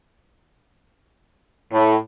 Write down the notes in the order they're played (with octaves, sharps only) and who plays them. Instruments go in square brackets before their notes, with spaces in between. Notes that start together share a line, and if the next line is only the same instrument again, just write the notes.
[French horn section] A2